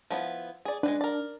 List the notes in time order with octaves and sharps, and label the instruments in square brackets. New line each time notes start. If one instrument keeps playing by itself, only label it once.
[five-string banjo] F3 B3 E4
G#4 D5
[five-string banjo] G#3 C4 B4 [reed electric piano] D4
[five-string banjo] A#4 D5